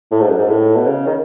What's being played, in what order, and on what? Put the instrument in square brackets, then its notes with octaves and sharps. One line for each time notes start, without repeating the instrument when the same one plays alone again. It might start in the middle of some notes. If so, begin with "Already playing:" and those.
[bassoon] A2
G#2
F#2
G#2
A2
B2
C#3
D#3